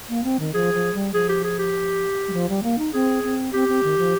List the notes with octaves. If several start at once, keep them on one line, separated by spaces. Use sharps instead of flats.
A#3
C4
D#3
F3 G#4
F3
G3
F3 G#4
G4
G#4
G4
G3
F3
G3
A#3
D#4
C4 G#4
C4
C4 G4
C4
D#3
F3